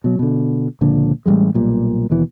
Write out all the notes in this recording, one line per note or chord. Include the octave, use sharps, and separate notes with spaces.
B2 F#3
B2 D3
C#2 A#2 D3 F3
A1 E3 G3 G#3
B1 A#2 G3
D#2 B2 E3